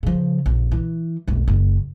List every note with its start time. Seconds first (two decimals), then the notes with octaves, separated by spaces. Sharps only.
0.03 C#3 F3
0.46 A#1 F2
0.72 E3
1.28 F1 B1
1.48 F#1